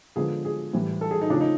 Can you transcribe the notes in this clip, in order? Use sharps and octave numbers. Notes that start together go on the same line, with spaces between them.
D3 F3 G#3 B3 G#4
G#4
A2 E3 G3
A4
G#4
D#4
C#3 F3 A3 D4
D#4